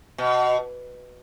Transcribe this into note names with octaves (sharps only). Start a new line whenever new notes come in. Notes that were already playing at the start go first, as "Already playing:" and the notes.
B2